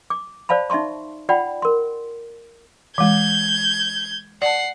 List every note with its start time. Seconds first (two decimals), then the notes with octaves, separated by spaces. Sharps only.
0.10 D6
0.49 C5 D5 F5 A5 B5
0.70 D#4 E5 A5 C6 C#6
1.29 F4 D5 F#5 G5 B5
1.62 A#4 C6
2.98 E3 G#3 G6 G#6
4.42 D5 F#5 A5 C7